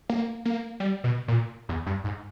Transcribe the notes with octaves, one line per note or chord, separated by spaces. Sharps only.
A#3
A#3
G3
B2
A#2
E2
G2
G#2